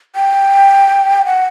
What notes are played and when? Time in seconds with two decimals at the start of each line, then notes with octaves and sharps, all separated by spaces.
0.16 G5
1.25 F#5